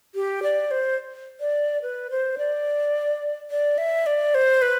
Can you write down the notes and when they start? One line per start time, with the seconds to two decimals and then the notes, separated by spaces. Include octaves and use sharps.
0.15 G4
0.43 D5
0.71 C5
1.40 D5
1.82 B4
2.10 C5
2.38 D5
3.51 D5
3.78 E5
4.06 D5
4.34 C5
4.62 B4